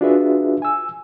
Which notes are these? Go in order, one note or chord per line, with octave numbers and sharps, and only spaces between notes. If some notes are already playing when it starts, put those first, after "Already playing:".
D4 F4 F#4 G#4 B4 E5
G#5 E6